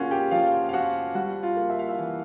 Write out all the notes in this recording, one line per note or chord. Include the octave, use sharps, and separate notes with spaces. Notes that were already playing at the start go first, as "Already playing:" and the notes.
Already playing: A#3 C#4 F4 F#4 G#4 F5 F#5
G4 G5
F3 F4 F5
F5
F3 F#4 F#5
G3 F#4 F#5
F4 F5
A#3
E5
F5
E4 E5
E3